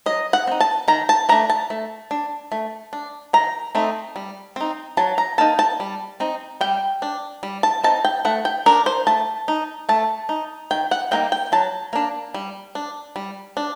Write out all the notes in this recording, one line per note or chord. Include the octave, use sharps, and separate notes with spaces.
F#3 D#5
F#5
C4 D#4
A5
D#3 A#5
A5
A3 D4 A#5
A5
A3
D4
A3
D4
D#3 A#5
A3 C4 D#4
G3
C4 D#4
F#3 A5
A#5
A#3 D#4 A5
A5
G3
C4 D#4
G3 G5
D4
G3
A5
C4 D#4 A5
G5
A3 F#5
G5
D4 A#4
C5
A3 A5
D#4
A3 A5
D#4
D#3 G5
F#5
G3 A#3 D#4 G5
G5
F#3 A5
A#3 D4
G3
D4
G3
D4